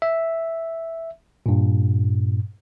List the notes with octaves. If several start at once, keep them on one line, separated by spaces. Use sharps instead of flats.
E5
G2 A#2